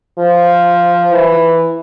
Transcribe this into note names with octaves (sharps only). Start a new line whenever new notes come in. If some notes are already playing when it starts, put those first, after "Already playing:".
F3
E3